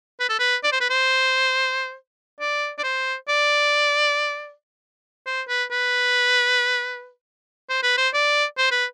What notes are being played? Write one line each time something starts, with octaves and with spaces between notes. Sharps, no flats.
B4
A4
B4
D5
C5
B4
C5
D5
D5
C5
D5
C5
B4
B4
C5
B4
C5
D5
C5
B4